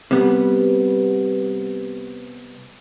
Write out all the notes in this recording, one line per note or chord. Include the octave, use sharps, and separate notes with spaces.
C3 G3 B3